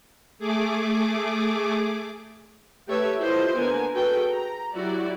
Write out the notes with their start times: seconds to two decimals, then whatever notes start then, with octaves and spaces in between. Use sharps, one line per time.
0.39 A3 G#4 D6
2.88 A3 G4 A4 B4 C#5 E5
3.18 E4 F4 G4 A4 C5 D#5
3.55 D3 A#3 B3 A#4 G#5
3.94 F#4 G#4 A4 B4 G5
4.30 A#5
4.74 F#3 E4 F#4 G4 D5